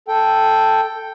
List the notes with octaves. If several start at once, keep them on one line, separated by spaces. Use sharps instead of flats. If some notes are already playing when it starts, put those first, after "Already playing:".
A4 G5